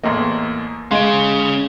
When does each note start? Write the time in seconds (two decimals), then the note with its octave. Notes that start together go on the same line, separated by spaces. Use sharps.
0.03 E2 A2 A#3 D#5 C6
0.91 G#3 C#4 D#5 F5 C6 D7